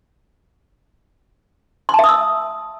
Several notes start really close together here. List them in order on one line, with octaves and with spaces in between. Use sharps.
C6 A5 E5 D#6 E6